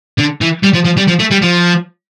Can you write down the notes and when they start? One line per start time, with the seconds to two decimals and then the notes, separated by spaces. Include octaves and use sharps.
0.18 D3
0.41 E3
0.64 G3
0.74 F3
0.85 F3
0.98 G3
1.08 F3
1.20 A3
1.31 G3
1.42 F3